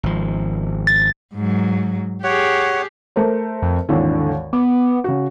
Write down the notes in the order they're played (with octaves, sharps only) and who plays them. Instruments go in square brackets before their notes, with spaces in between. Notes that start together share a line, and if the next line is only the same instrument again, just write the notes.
[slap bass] G#1 F3
[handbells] A6
[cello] G#2 F#3
[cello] G4 G#4 [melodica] C#5 F#5
[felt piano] A3 A#4 C5
[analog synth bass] F2
[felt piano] G#1 D#2 E3 [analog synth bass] D3
[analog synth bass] B3 [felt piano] D6
[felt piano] C#3 F#4